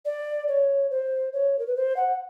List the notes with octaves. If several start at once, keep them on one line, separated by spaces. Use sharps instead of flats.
D5
C#5
C5
C#5
A#4
B4
C5
F#5